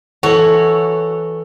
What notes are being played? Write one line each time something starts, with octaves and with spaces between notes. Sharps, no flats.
E3 F#4 A4 C#5 A#5